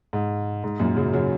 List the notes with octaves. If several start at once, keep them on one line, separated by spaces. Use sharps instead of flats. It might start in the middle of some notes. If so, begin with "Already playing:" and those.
G#2
G#2
F#2 A#2
C#3 F#3
C#3 F#3